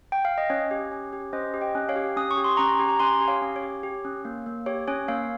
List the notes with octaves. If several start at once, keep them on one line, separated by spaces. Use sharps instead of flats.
G5
F5
D#5
C#4 C#5
G4
C#4
G4
C#4 C5 D#5
G4
D#5 G5
C#4
C#5 F5
G4
C#4 D#6
C#6
G4
C6
C#4 A#5 C#6
G4
A#5
C#4 G#5 C6
G4
C#5 F5
C#4
C#5
G4
G4
C#4
A#3
A#3
G4 C#5
C#4 C#5
A#3 C#5 F5